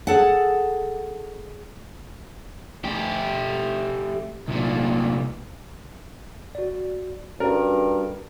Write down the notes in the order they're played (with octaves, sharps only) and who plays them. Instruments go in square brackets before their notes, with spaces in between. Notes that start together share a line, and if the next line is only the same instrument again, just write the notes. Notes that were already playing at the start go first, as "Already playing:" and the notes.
[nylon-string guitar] G#4 A4 F#5
[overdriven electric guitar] A3 G4
C2 A#2
[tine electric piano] F#4 D5
[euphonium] G2 [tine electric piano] C#4 F#4 A4 [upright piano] A#4